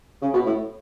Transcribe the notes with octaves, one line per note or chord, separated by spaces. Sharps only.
C#3
B2
A2